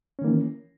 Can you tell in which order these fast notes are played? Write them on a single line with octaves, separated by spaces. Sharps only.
C#4 D#3 A#3 E3